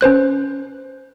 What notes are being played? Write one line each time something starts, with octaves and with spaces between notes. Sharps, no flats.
C#4 B4 C5 F#6